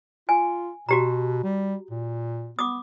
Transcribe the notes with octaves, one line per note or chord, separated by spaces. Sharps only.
F4 G#5
B2 F#4 G4 A#5
G3
A#2
B3 D6 D#6